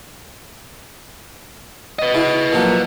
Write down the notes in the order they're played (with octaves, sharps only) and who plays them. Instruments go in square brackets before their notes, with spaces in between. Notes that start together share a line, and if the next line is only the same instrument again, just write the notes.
[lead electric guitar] B4 D#5
[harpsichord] C#3 E4
A#2 F3 F#3